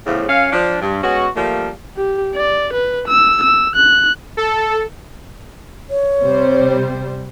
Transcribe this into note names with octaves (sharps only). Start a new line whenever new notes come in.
E2 A2 C#3 F3
F#2 C#4 F5
F3 D4
G2
G#3 B3 C#4 F#4
F3 G3 A3 A#3
G4
D5
B4
E6
E6
F#6
A4
C#5
C3 G3 C5